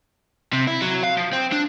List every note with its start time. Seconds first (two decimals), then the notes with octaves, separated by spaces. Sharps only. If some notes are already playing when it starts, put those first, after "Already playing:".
0.53 C3
0.67 E4
0.81 F#3
1.03 F5
1.17 F3
1.33 C4
1.52 D4